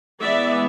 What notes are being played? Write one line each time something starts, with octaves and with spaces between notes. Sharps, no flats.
E3 G#3 B3 D5 E5